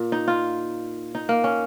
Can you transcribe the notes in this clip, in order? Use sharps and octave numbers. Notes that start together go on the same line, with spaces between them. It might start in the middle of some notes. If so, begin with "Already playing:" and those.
Already playing: A#2
D#4
F4
D#4
A#3
C#4